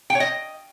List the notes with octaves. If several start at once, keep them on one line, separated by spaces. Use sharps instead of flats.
G5
C#5
D#5